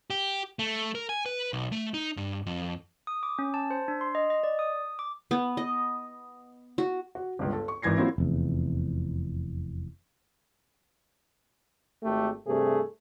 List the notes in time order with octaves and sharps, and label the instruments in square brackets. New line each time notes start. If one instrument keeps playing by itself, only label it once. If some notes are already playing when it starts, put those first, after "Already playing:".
[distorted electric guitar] G4
A3
A#4
G#5
B4
B1
A3
D#4
G2
F2
[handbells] D#6
D6
C#4
A5
C5
D4
C6
D#5
D#5
D5
D#6
D6
[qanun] B3
D#5
F#4
[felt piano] F#4
G1 C#2
A4
C#6
G#1 E3 G#6 A#6 C7
F#3 A#3 C4 C#4 E4 F4
[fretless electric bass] F1 E2
[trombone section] G#1 A3 G4 A4
G2 C3 A3 G#4